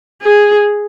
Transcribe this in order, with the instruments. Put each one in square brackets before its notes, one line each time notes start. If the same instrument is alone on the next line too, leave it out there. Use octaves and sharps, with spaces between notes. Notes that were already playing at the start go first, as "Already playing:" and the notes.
[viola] G#4